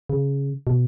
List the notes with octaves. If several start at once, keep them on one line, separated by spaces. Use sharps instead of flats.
C#3
B2